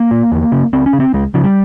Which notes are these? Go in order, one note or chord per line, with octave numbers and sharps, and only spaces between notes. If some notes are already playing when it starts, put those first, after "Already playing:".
Already playing: A#3
A#2
E2
C#3
C#2 C4
C#4
C#3
C4
C#2 G#3
C#3 F3
G3